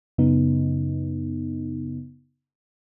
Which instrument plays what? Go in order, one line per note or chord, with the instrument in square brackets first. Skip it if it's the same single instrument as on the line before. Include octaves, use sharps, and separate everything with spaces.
[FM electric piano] F#2 C#3 B3 D#4